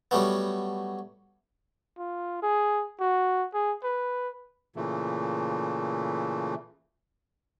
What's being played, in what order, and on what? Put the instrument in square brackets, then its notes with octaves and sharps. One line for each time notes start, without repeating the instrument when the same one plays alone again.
[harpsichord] F#3 G3 A3 B3
[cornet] F4
G#4
F#4
G#4
B4
[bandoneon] A#2 C#3 E3 A3